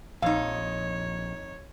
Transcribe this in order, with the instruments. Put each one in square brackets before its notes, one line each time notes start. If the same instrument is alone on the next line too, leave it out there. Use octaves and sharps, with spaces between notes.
[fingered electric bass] A#1 [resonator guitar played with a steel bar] F2 D#4 [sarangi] C#5 [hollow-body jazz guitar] F5